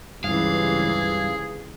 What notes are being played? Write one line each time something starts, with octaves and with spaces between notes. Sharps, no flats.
C#2 G2 C3 E3 G#4 F5